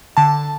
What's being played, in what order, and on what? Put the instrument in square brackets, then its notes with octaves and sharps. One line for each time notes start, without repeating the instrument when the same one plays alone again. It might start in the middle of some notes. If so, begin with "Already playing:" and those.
[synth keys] D3 A5